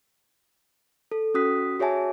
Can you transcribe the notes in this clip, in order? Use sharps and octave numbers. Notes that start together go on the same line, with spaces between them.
A4
C#4 F#4 D#6 F#6 B6
F#4 G#4 C#5 E5 G#5 A5